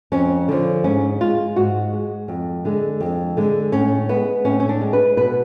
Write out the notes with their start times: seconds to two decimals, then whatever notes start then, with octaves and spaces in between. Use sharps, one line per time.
0.12 F2 C#4
0.48 D3 F3
0.84 G#2 C#4
1.21 G#3 F4
1.56 G#2 F#4
1.93 G#3
2.28 F2
2.65 D3 G#3
3.00 F2
3.37 D3 G#3
3.72 A2 C#4
4.09 G#3 B3
4.45 A2 C#4
4.60 C#4
4.69 D4
4.81 G#3
4.93 B4
5.17 B2 B4